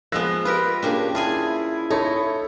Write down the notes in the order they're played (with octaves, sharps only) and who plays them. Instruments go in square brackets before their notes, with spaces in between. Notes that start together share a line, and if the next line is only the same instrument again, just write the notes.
[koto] F3 G#3 B3 [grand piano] E6 F#6 A#6
[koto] F4 G4 A#4 [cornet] B4
[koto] C#3 A#3 D4 [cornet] G4
[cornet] E4 [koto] F4 G#4 G#5 [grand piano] A5
[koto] D#4 [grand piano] A4 C#5 B5